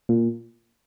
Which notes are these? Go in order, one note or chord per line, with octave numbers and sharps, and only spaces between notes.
A#2